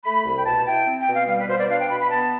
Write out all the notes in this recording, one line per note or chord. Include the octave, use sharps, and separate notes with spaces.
A3 B5
C2 B5
G5
B2 A5
E4 G5
C4
G5
B2
F5
G3 F5
B4
B2 C5
D5
D4 F5
G5
B2 B5
B5
B3 A5